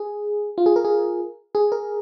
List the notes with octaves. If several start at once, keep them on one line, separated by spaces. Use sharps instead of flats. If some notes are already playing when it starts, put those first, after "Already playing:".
Already playing: G#4
F4
G#4
A#4
G#4
G#4
A#4